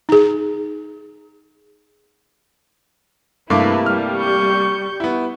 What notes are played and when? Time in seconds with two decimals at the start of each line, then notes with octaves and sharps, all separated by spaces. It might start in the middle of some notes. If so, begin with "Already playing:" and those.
0.09 D#4 G#4
3.50 G2 C3 A3 A#3 E4 B4 D6
3.86 G3 F6
4.16 C#6 G6
5.00 B3 E4